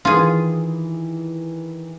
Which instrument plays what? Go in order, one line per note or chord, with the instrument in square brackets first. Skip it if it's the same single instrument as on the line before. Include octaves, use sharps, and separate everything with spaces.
[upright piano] D#3 E3 [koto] F4 G#4